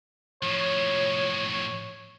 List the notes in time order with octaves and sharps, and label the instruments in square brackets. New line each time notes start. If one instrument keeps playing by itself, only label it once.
[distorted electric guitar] A2 F3 [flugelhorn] C#5